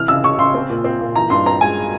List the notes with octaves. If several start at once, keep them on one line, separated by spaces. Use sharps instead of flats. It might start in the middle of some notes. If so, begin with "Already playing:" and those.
Already playing: C3 E3 F6
C#3 E6
C#3 C#6
C#3 C6
C4
A#2
C4
A#2
E3 A#5
G2 C6
C4 A#5
G#3 G#5